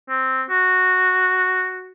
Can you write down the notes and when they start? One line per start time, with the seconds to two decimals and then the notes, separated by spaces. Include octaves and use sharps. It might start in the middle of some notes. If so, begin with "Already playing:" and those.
0.09 C4
0.50 F#4